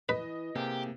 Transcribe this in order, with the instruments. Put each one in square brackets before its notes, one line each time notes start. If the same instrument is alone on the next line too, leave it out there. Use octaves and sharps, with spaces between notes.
[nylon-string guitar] E3 [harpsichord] B4 [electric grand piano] D#5
[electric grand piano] C3 A#3 [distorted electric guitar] G4 [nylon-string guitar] G#4